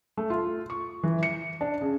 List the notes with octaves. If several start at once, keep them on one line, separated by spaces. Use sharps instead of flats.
A3
F4
C#6
E3
C#7
D4
C#3